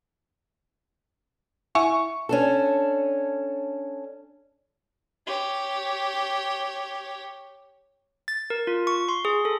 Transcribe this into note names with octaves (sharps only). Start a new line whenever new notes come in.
E4 F#5 G#5 C#6
C#4 D4 A4
G4 C#5
A6
A#4
F4
C#6
C6
G#4
A4